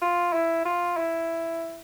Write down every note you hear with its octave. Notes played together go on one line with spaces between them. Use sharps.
F4
E4
F4
E4